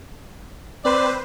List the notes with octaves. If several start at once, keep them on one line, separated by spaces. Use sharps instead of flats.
C4 B4 C5 D5